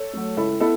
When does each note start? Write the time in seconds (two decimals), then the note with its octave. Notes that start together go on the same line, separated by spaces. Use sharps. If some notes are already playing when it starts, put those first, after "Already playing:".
Already playing: A4 C#5
0.13 F#3 A3
0.37 C#2 E4 A4
0.60 B3 E4 A4